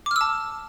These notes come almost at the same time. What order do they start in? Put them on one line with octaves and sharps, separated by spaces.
D6 F6 E6 A5